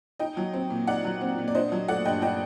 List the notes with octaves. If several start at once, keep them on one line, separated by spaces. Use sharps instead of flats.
D#4 D#5 G5
F#3
C4
A#2
D#4 D5 F#5
F#3
C4
A#2
D5
D4 C5 D#5
F#3
A3 D5 F#5
G2 D#5 G5
D4 D#5 G5